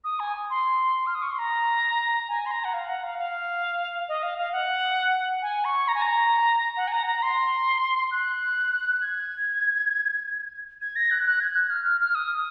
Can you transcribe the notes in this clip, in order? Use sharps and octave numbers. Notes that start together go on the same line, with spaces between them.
D#6
G#5
C6
F6
D#6
C#6
C6
A#5
G#5
C6
A#5
F#5
F5
F#5
F5
F5
D#5
F5
F5
F#5
G#5
C#6
A#5
G#5
A#5
F#5
G#5
A#5
A#5
C6
F#6
G#6
G#6
A#6
F#6
F#6
G#6
F#6
F6
F6
F6
D#6